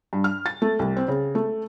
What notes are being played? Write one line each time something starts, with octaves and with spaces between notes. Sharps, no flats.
G2
F6
A6
A3
C2
C4
C#3
A3